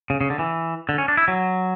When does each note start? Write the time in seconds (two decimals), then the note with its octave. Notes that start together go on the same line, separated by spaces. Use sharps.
0.10 C#3
0.21 C#3
0.30 D3
0.39 E3
0.89 D3
0.98 C#4
1.08 D4
1.17 E4
1.28 F#3